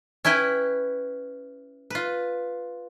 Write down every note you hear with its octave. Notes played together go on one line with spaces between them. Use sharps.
C#4 E4 B4 G5
F4 B4